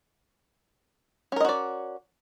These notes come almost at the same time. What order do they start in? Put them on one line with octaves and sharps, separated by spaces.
C#4 A#4 D#5 F#4 D5